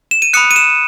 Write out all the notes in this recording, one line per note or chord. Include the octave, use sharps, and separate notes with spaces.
E7
D#7
B5 D#6 F#6 C#7
D#7
E7